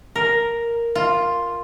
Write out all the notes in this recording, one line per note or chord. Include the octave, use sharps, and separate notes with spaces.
A#4
F4